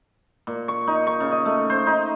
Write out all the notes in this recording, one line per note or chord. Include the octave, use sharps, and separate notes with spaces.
A#2
C#6
D#4
C#6
C#3
D#5
A3
C5
D#4